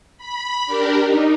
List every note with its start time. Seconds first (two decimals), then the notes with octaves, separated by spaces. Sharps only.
0.18 B5
0.66 D4 G4 A#4
1.04 D#4